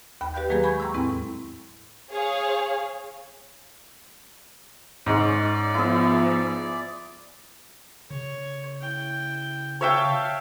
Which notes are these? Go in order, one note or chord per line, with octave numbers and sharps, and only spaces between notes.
D#2 G5 B5
G4 B4 D5 F5 F#6 G6
D#3 F#3 G#3 A#3 G#4 B4
G#5 B5 C#6 G6 G#6
G5 A#5 C6 C#6 E6
E2 A2 G#3 C4 E4
G#4 C#5 F5
G#2 G#3 C#4 D5
F3 B3 E4 G#4
C#3 C#5
E4 G5
C#5 E5 F5 G5 A5